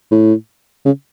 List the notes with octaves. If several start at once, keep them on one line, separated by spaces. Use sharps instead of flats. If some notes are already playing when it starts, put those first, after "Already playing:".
A2
C#3